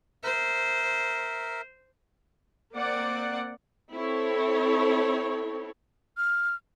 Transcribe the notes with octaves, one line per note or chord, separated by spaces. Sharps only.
A#4 C5 E5
A#3 C4 D5 F#5
C4 E4 A4 C#5
F6